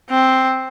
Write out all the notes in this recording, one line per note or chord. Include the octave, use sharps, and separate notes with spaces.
C4